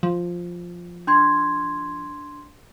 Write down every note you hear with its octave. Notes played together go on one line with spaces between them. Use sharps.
F3
D4 C6 G#6